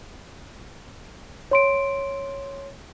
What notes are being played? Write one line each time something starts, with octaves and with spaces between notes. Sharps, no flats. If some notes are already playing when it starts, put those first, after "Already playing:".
C#5 C6 D7